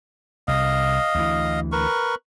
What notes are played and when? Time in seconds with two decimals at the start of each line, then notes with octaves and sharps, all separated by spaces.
0.48 C2 D#5 F5 D#6
1.15 D2 E3
1.72 A#4 B4 C#6